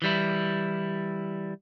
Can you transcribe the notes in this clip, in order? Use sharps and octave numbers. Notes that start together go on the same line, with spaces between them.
E3 G3 E4